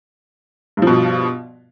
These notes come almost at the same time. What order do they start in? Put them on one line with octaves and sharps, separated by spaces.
G2 F3 B2